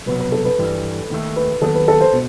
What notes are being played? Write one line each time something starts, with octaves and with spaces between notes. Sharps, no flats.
C2 B2 F#3 B4
B4
A4
B4
G2 E3 G3
D#2 D#3 A3
B4
D#2 D#3 F#3 B3 A4
B4
A4
C5
B2